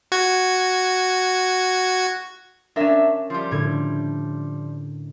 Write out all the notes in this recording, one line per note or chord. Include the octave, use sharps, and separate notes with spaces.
F#4 G#6
C#4 D4 A#4 E5
F3 G3
A2 D3 G#6